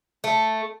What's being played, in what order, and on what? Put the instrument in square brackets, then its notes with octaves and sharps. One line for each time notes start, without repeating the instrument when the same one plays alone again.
[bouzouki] A3